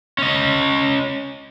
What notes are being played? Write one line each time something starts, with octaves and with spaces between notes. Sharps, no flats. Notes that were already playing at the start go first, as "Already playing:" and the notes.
C#4 D#5